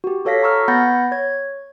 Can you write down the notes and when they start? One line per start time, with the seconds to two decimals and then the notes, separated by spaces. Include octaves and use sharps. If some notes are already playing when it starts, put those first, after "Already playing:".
0.04 F#4 G4
0.25 F#4 A4 C#5 F5 A#6 B6
0.43 A#5 C#6 E6 F6
0.68 B3 F#5 B5 G6 A6 A#6
1.11 C#5 G#6